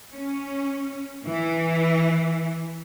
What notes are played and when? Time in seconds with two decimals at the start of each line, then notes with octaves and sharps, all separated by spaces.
0.12 C#4
1.25 E3